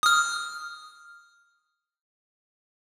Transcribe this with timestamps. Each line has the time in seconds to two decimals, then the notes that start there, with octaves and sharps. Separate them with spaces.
0.03 D#6 F6